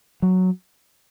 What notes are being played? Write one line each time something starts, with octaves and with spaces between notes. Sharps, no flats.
F#3